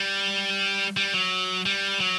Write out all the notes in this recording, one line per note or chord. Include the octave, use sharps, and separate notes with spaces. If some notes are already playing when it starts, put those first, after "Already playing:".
Already playing: G3
G3
F#3
G3
F#3